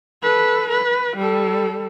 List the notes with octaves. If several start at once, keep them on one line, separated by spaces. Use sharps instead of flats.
A4 B4
B4
G3 A4